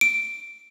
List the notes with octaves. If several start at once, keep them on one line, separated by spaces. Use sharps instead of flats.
D7